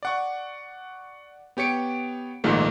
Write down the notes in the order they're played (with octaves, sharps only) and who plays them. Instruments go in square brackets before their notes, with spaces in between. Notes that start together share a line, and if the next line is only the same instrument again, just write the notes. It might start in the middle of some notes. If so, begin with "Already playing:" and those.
[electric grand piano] D5 F#5 C#6
B3 G4 C#5 C#7 D7
A#1 G#2 D#3 A3 F4